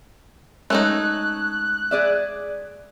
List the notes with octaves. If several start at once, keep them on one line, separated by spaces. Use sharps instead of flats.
G#3 A3 C#4 D#4 F#6
G#4 D5 E5